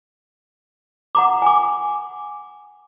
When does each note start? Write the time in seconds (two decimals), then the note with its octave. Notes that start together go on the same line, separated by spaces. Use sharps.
1.15 F#5 A#5 D6
1.42 G#5 D6